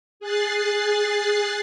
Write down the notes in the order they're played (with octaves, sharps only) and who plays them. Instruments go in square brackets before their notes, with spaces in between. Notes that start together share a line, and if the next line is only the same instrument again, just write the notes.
[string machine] G#4 F#6 A6 C7